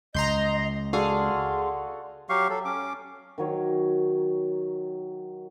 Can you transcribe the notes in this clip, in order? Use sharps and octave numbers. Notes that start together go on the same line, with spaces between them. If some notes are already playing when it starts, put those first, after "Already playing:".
C#2 D#5 A#5 C6 G6
F#4 G#4 A4 D5 F5 C6
F#3 G4 F5 C#6
F#3 A4
C#4 D6
D#3 F#3 C#5